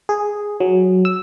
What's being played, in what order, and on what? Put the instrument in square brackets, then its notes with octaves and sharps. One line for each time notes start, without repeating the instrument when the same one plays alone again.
[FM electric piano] G#4
F#3
E6